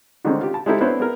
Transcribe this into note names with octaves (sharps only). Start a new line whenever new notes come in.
D3 D#3 G#3 A3 C4 C#4
F4 G4
A5
G#3 C4 D#4 E4 G4 A4
B3 C4 D4 E4 C5 C#5
B3 G#4 A#4